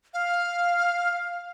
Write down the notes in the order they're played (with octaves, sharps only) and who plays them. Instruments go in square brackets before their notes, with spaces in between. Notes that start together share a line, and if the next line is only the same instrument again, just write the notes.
[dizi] F5